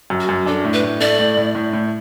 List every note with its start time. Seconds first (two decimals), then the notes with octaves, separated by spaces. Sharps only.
0.10 F#2
0.20 F#4
0.29 F#2
0.46 D4 A4
0.64 A2
0.73 B4
0.83 A2
1.00 A3 D5
1.19 A2
1.37 A2
1.55 A2
1.73 A2